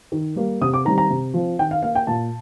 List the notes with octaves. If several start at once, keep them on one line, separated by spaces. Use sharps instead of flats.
D#3
G3 A#3
C3 D#6
D6
D#3 G3 C4 A#5
A#5
C3
F3 C4
D#3 G5
F5
A#3 F5
G5
A#2 A5